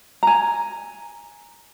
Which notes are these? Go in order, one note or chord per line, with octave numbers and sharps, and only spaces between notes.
G#5 A#5